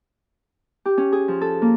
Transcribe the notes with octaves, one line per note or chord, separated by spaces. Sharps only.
G4
C#4
G#4
F3
A4
A#3